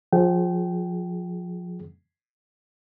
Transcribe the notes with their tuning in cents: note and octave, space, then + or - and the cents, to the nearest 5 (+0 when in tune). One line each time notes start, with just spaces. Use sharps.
F3 +25 G#4 +15 G5 -30